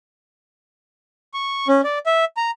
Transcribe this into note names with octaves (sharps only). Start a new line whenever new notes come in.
C#6
C#4
D5
E5
A#5